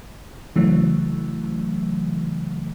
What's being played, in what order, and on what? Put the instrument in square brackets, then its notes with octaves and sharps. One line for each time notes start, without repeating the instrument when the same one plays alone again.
[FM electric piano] C#3 E3 F#3 A3